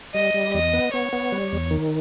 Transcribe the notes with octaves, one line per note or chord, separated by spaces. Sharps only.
G3 D#5
G3
E2 D#5
B3
B3 C#5
B3
G3
E2
D#3